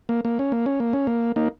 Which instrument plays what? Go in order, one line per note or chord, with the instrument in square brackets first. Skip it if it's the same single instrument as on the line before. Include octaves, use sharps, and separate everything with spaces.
[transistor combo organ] A#3
A#3
C#4
A#3
C#4
A#3
C#4
A#3
A#3 D#4